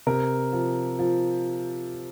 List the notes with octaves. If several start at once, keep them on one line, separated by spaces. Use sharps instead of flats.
C3 A#4
F3
F3